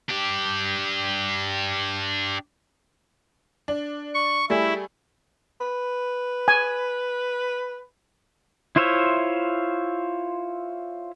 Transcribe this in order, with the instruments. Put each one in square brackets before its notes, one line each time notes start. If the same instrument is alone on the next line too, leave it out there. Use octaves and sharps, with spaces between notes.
[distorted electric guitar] D4 G4
[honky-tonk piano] D4
[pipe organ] C#6
[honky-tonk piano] G3 A3 G#4 [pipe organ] E4
[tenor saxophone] B4
[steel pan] G#5
[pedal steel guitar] E4 F4 C5 C#5 E5